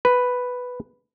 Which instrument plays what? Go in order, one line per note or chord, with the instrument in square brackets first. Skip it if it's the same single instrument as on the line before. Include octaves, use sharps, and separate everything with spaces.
[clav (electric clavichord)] B4